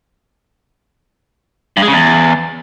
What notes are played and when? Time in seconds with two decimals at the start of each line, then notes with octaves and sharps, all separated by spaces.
1.77 G2
1.82 G#3
1.88 C#3
1.93 E2